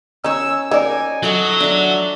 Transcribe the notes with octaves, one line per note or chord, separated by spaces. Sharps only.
C#4 D#4 C#5 E6
D#4 A#4 C#5 D5 G#5
F#3 F#4 A4 D#5 E5
D4 A4 E5